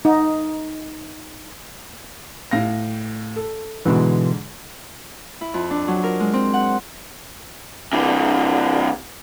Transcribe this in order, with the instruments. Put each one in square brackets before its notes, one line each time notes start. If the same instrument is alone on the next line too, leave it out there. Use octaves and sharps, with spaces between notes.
[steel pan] D#4
[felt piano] A2 F5 A#6
A4
[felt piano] G#2 D3 G#3 [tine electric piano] B2 E3
[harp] E4
F2
D4
F#3
A#4
G#3
C4
F#5
[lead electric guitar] C3 E3